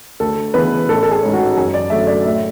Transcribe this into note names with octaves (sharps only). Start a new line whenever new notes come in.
D2 A4
C#3 E3 B3 B4
A1 A4
A4
G#4
G#2 G#3 C#4
F#4
F#2 G#4
D5
D3 F#3 A3 C#4 E5
D5
A2 E5